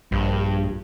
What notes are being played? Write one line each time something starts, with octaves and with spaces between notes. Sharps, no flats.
A#1 G2